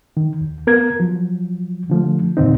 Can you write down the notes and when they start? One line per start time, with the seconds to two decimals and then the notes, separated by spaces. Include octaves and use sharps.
0.17 D#3
0.41 D#2
0.67 B3 A#4 G#6
1.00 F3 F#3
1.90 D3 F3 A3
2.37 D#2 A#2 D3 C4 D#4